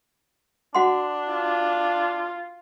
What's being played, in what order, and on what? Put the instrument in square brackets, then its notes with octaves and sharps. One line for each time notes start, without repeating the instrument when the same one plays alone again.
[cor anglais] D4 [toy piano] F#4 F#5 C6
[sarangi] F4